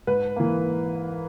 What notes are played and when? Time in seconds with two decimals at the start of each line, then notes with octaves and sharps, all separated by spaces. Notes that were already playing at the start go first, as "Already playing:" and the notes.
0.07 G#2 B4
0.36 E3 A#3